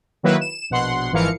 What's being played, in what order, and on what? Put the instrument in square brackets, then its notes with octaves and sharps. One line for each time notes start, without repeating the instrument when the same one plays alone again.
[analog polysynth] D#3 F#3 A#3 E4 B4
E7
A#1 B2 F#5 C6
G#1 E3 F3 A#4 F5 C#7